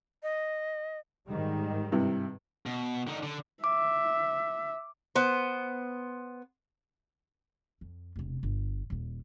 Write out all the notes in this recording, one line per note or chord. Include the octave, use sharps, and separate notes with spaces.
D#5
G#2 D#3 G3
G2 C3 E4
B2
D3 D#4
D3
E5 D6
B3 C5
F2
E1 C3
G1
D#1 A#2